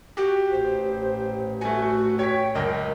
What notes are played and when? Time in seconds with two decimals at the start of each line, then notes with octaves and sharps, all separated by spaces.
0.17 F#4 G4
0.51 A1 C5
1.61 A3 F#4 G#5
2.19 C#5 G5 B6
2.55 C#2 F#2 A#4